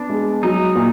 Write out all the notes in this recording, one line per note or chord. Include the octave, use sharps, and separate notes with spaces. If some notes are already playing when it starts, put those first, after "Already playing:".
Already playing: B3 D4
G#3
F#3 D#4
A#2